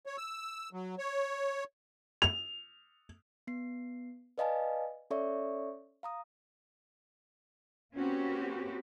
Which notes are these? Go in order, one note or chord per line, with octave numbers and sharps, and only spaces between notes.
C#5
E6
F#3
C#5
F7
B3 C7
B4 D5 D#5 F5 G#5 A5
C#4 A4 C#5 D5 E5 C#6
F5 A#5 D#6
A#3 C4 C#4 F#4 G4 B4